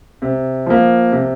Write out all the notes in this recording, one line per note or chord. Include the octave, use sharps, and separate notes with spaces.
C3
F3 A#3
C3